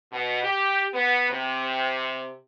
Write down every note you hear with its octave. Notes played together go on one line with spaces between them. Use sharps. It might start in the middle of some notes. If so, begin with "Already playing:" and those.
B2
G4
B3
C3